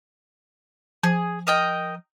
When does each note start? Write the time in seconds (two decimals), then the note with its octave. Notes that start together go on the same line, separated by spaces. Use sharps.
1.03 F3 G#4
1.47 A#4 D#5 G5